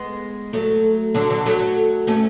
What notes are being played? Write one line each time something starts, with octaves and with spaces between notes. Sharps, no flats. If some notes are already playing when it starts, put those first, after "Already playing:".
Already playing: G#3 B3
F#3 A3
D3 F#3
D3 F#3
F#3 A3
A3 C#4